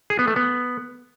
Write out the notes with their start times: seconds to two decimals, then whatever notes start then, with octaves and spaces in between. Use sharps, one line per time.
0.10 G#4
0.19 B3
0.28 A3
0.36 B3